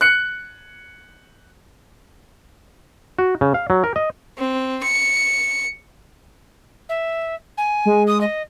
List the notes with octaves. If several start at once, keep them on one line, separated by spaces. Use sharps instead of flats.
F#6 C#7
F#4
C#3
F5
F#3
A#4
D#5
C4
C#7
E5
G#5
G#3
D#6
D#5